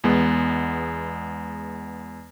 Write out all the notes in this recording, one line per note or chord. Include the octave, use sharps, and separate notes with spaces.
E2 G#3 B3